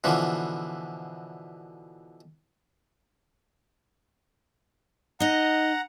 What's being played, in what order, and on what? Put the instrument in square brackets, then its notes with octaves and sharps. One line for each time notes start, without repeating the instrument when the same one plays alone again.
[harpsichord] B2 D3 E3 F3
[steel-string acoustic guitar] D#4 D#5 [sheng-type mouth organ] F#5 A#5